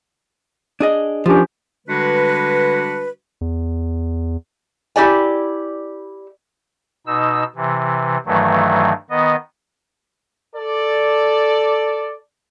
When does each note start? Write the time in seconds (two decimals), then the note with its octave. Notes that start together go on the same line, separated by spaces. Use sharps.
0.80 D4 G#4 D#5
1.26 F3 C#4 D4 G4 A#4
1.87 D3 G3 G#3 D4 F#4 B4
3.41 E2
4.96 E4 G4 D5 G#5
7.07 B2 D#4 E6
7.56 C3 E3
8.26 G2 D#3 E3 F#3 A3
9.10 D#3 B3 D#5
10.55 A4 D5